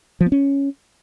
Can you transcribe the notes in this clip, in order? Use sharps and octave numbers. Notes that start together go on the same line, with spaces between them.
F3
B3
C#4